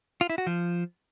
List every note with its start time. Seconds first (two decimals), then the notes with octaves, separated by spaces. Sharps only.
0.21 F4
0.30 E4
0.38 F#4
0.47 F3